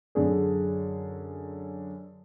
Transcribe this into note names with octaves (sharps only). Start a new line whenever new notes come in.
F#2 D3 G#4